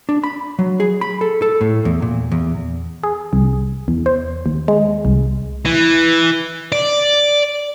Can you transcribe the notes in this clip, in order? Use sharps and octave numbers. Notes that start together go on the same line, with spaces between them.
D4
B5
F#3
G#4
B5
A4
A4
A2
E2
A#2
E2
G#4
C2
E2
C5
D#2
G#3
C2
E3
D5